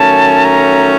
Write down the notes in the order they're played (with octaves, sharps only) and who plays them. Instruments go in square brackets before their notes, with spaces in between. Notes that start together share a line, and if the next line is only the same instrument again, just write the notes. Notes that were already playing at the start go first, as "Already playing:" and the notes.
Already playing: [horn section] D#3 F#3 A3 C#4 [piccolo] A5
[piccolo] A#5